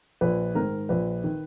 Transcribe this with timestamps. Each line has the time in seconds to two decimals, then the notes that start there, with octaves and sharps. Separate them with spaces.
0.21 A#1 B4
0.55 G#2 D#3 A#4
0.89 A#1 B4
1.24 D#3